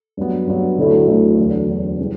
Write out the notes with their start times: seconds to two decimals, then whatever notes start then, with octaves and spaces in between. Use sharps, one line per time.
0.17 G2 F#3 B3
0.47 G2 F#3 B3
0.78 D2 D3 F#3 A3 E4
1.08 D2 D3 F#3 A3 E4
1.38 E2 D3 F#3
1.68 E2 D3 F#3
1.99 C#3 E3 G3